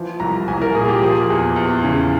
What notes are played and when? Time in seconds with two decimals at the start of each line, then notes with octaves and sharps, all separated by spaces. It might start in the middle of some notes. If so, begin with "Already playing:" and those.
Already playing: E3 F3
0.20 C2 A#5
0.48 C2 G#5
0.62 A#4
0.75 A#2 G#4
0.88 G4
1.02 F3 G#4
1.30 E2
1.56 E2
1.84 C#3